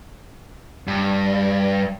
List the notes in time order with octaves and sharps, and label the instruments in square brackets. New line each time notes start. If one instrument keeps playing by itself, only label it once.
[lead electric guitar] G2